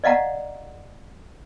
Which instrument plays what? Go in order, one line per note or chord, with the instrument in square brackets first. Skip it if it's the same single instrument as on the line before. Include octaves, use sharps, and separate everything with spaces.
[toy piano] D5 D#5 F5 F#5 A#5